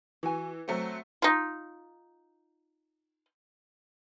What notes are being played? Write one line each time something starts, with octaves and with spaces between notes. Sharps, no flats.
E3 F#4 G#5
F#3 A3 C4 F#4 A#5
D#4 F4